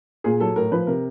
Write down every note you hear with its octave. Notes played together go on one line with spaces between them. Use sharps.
A#2 G#4
F#3 A4
A2 A#4
F3 B4
C3 A#4